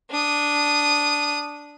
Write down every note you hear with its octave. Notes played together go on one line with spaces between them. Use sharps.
D4 D#6